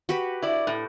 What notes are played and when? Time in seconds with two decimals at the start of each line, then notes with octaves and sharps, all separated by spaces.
0.09 F#4 G4 B4
0.42 E4 D5
0.67 A2